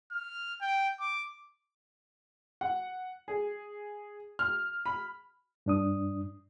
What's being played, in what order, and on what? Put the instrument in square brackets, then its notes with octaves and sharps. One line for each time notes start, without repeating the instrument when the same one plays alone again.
[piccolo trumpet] F6
G5
D6
[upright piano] F#5
G#4
F6
B5
[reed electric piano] G2 D4 D#6